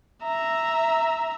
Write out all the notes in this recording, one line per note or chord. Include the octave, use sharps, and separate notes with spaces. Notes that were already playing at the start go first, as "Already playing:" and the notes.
E5 A#5